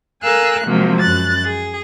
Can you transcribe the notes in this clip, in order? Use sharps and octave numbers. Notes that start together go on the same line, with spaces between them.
A4 A#4 F5 G#5 E6 F#6
C3 F3 F#3 G#3 A#3
F#2 F#6 A6
G#4